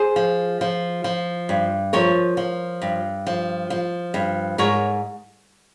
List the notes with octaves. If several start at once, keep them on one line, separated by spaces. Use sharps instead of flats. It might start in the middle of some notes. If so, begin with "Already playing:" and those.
Already playing: G#4 C5
F3
F3
F3
G2
F3 A#4 C#5
F3
G2
F3
F3
G2
G#2 A#4 C#5